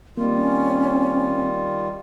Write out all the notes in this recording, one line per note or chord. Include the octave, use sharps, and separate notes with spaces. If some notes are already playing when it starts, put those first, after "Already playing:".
D#3 G3 A#3 C4 F4
C#4